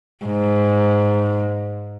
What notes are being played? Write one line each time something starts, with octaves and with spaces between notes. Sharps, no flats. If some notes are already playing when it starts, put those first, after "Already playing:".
G#2